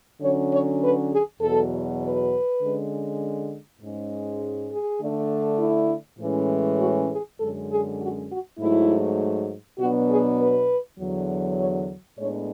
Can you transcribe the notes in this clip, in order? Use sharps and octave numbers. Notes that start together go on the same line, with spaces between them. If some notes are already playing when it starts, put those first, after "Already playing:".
D3 F#3 C#4 C#5
C#5
B4
G#4
E2 B2 F#3 A4
B4
D3 G#3 C#4
G#2 G#3 C#4
G#4
D3 A3 D4
E4
A2 E3 G#3 C#4
F#4
G#4
F#2 D3 G#3 C#4 A4
G#4
F#4
F#4
G#2 F#3 A3 E4
B2 F#3 B3 D4 F#4
G#4
B4
E2 D3 F#3
C#5
A2 G#3 B3 D4 C#5